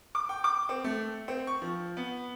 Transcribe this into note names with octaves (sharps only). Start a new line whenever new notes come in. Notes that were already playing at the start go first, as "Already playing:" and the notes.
D6
G5
D6
C4
A3
C4
C#6
F3
B3